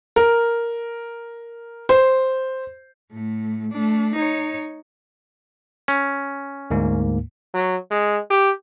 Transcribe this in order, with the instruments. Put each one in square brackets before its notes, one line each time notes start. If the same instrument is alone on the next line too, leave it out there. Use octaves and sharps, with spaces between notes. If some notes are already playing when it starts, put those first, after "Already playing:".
[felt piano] A#4
C5
[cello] A2 A3
A3 D4
D#4 C#5
[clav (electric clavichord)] C#4
[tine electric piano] D2 G#2 A#3
[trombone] F#3
G#3
G4